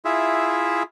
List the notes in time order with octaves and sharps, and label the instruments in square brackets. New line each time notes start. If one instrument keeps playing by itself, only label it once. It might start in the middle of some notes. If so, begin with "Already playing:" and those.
[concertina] E4 F4 G#4 E5